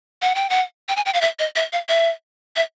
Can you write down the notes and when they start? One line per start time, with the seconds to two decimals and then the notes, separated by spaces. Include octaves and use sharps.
0.22 F#5
0.35 G5
0.50 F#5
0.89 G5
0.96 G#5
1.06 G5
1.14 F5
1.22 E5
1.39 D#5
1.56 E5
1.73 F5
1.89 E5
2.56 E5